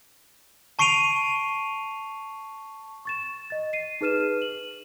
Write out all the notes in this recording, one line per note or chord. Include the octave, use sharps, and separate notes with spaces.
A5 C#6 C7 D7 D#7 F7
C#6 A6 E7
D#5 A6
C7 D#7
D#4 G#4 B4 F6 D#7 E7
F#7